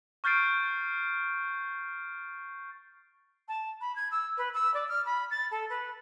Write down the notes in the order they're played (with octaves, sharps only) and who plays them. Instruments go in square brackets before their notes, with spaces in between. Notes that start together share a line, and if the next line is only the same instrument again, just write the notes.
[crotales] C#6 F6 G6 A6 C7 D7
[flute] A5
B5
G#6
E6
B4
E6
D5
F6
B5
A6
A4
B4